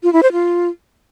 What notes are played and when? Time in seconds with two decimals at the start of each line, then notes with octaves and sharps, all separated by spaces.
0.03 F4
0.13 E4
0.23 C5
0.32 F4